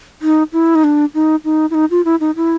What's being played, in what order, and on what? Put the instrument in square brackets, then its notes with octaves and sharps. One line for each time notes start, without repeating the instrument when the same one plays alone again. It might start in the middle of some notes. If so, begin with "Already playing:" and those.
[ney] D#4
E4
D#4
D4
D#4
D#4
E4
D#4
F4
E4
D#4
E4